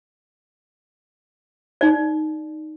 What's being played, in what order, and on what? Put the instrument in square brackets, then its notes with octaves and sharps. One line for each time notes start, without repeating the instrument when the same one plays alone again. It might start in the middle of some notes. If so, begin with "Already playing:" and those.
[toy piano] D#4 D5